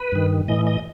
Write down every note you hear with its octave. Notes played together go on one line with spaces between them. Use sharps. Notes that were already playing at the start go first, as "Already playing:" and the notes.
Already playing: B4
G2 D#3
A2 E3 D#5
D#5